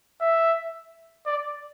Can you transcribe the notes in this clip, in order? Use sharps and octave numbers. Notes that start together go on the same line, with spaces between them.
E5
D5